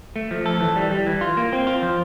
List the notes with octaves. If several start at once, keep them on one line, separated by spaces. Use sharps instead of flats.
A3
F3
A4
E3
G3
G3
E3
F4
A#3
C4
F4
F3